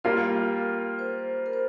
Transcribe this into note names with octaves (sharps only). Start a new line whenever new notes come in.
G3 A#3 F4 A#4
C5
A#4
C5